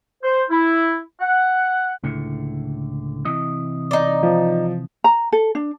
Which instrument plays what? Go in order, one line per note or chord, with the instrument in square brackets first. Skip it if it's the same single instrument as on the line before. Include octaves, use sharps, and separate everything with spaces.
[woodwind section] C5
E4
F#5
[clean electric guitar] C#2 A2 D3
C3 E3 D#5
[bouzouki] D#4 D5
[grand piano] F3
[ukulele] A#5
A4
D4